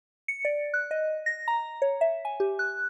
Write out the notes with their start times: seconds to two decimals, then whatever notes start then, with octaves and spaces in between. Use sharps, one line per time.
0.28 C#7
0.45 D5
0.74 F#6
0.91 D#5
1.26 A#6
1.48 A#5
1.82 C#5
2.01 E5
2.25 G#5
2.40 G4
2.59 F#6